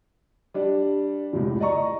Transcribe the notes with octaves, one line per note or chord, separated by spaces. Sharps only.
G3 D4
F1 C#2 A2
D5 D#5 A#5 C#6